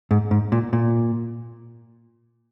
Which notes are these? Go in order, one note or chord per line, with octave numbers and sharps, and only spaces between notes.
G#2
G#2
A#2
A#2